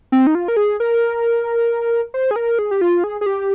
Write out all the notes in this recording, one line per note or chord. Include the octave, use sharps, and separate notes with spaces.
C4
D#4
F4
A#4
G#4
A#4
C5
G#4
A#4
G#4
G4
F4
G#4
G#4
G4